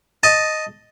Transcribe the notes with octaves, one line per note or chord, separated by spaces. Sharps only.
D#5 A5